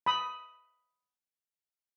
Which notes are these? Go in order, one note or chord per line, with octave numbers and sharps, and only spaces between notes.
B5 D#6